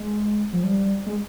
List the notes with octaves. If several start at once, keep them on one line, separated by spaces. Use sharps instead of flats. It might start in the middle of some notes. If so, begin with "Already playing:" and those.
Already playing: G#3
F3
G3
G#3